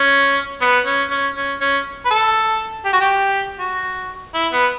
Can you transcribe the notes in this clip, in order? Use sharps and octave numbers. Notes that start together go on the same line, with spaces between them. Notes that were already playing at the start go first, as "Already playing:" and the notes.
Already playing: C#4
B3
C#4
C#4
C#4
C#4
B4
A4
G4
F#4
G4
F#4
E4
B3